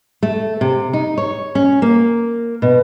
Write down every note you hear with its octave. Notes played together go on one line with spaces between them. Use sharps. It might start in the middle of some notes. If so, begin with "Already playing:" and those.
A3
C3
D#4
C#5
C#4
A#3
B2